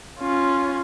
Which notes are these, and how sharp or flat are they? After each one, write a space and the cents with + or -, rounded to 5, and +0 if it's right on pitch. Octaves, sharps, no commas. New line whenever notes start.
C#4 +0 F4 +0